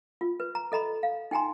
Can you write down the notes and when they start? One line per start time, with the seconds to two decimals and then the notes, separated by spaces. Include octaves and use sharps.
0.21 F4
0.40 B4
0.55 A#5
0.72 A4 D#5 A#5 B5
1.03 F5
1.31 D#4 G5 G#5 A#5 C6